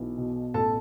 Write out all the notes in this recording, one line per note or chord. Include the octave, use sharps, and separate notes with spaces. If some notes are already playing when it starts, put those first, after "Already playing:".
Already playing: B1 E3
B2
A1 A4 A5